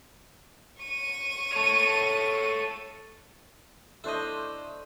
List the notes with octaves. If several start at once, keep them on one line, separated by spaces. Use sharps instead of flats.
C#6 D#7
A4 C#5
A3 D4 E4 C5 D#5